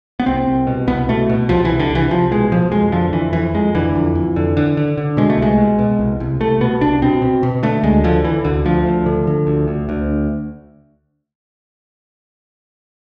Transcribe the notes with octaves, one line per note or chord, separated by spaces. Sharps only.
B3
C2 C4
C2
B2
C2 B3
B2 A3
B2
C2 F3
C2 E3
D3
C2 E3
C2 F3
B2 G#3
B2 F3
F2 G#3
D3 F3
F2 E3
F2 E3
F2 G#3
D3 E3
F2
F2
D3
D3
D3
D3
B2 G#3
A3
C2 G#3
B2
B2
C2
C2
C2 A3
B2 B3
C2 D4
B2 C4
B2
B2
D3 A3
D2 G#3
D3 F3
D3 E3
D2 D3
D2 F3
D2
D3
D3
D2
D2
D2